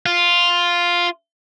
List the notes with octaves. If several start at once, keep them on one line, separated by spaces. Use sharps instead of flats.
F4